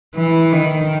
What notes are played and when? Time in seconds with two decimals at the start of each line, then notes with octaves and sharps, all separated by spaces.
0.15 E3
0.52 D#3